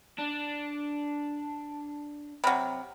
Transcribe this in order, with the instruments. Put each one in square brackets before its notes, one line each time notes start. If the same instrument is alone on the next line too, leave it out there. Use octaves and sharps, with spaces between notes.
[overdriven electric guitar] D4
[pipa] C3 F#3 [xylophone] B5 F6